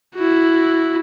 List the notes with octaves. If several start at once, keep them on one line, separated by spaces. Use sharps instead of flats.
E4 F#4